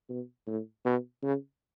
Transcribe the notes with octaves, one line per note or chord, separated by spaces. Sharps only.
B2
A2
B2
C#3